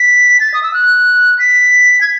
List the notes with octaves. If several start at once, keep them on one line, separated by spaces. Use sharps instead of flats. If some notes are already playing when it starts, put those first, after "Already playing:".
Already playing: B6
A6
D#6
E6
F#6
B6
G#6